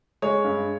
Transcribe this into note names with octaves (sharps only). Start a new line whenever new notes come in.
G#3 C#5
G2